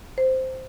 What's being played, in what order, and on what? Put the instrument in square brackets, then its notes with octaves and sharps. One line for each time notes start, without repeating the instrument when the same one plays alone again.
[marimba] C5